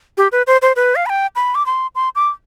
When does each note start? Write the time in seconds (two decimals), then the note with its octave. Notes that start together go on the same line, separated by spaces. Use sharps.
0.18 G4
0.32 B4
0.47 C5
0.62 C5
0.76 B4
0.96 F5
1.06 B5
1.09 G5
1.36 B5
1.55 D6
1.66 C6
1.95 C6
2.15 D6